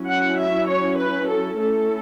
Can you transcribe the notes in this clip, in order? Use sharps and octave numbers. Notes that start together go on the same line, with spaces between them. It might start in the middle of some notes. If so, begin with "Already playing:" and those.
Already playing: F#3 C#4 E4
F#5
E5
C#5
B4
A4
A3 C#4 E4 A4